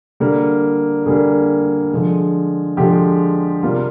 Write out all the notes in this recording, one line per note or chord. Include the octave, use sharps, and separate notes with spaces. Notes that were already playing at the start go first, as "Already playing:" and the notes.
D3 G3 A#3 A#4
D3 G3 A#3 G#4
D3 F3 G#3
D3 F3 G#3 G4
C3 G3 A#3 F4